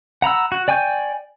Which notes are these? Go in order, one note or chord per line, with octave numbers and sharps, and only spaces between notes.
F#5 A#5 B5 E6
F#4
D5 G5 G#5 C#6 G6